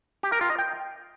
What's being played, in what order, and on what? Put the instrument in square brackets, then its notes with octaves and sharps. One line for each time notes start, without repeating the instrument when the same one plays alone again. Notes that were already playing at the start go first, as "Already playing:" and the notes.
[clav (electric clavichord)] G4
A#4
F4
D#5
G5